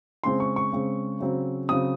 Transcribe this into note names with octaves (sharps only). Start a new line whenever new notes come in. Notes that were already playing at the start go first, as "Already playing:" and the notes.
C#3 G#3 C4 C6
C#6
C#6
C#3 G#3 C4
C#3 F#3 C4
C#3 F#3 C4 D#6